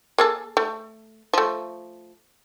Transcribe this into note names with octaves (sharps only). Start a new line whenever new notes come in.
A#3 G#4 A4
A3
F3 A3